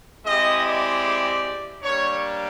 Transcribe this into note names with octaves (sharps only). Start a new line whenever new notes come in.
G#3 C4 E4 G4 D#5
D5
G3 A#3 D4 C#5